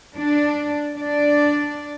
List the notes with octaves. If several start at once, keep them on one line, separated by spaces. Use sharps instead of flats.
D4
D4 D5